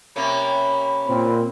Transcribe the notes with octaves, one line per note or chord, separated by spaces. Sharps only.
C3 A#3 C#4 B5
A#2 C4